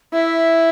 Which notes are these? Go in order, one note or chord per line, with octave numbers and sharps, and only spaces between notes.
E4 E5